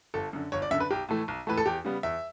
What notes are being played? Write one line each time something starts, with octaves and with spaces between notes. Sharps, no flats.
G1 A4
F#2 D3
G1 C#5
D5
F#2 D3 E5
B4
B1 G4
A2 E3 A3
B1
A2 E3 A3 B4
A4
E2 G4
C#3 G3 B3
E2 E5